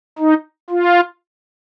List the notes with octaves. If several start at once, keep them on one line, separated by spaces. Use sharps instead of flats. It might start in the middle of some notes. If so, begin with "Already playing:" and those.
D#4
F4